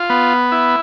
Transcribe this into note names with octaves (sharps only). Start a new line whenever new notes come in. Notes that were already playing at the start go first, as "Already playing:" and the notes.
Already playing: F4
B3
E4